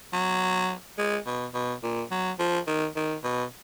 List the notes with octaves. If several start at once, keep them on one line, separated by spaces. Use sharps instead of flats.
F#3
G#3
B2
B2
A#2
F#3
F3
D#3
D#3
B2